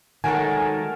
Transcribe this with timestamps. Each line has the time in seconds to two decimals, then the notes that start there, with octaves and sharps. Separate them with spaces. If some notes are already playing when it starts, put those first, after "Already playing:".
0.24 D#3 F#3 G#3 A3 F#4 A#4 G#5 A5